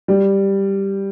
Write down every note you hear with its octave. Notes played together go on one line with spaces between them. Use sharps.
G3